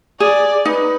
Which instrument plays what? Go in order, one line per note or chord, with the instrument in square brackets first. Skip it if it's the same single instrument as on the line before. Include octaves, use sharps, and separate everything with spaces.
[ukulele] G#4 [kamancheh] D5
[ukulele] D#4 [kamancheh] B4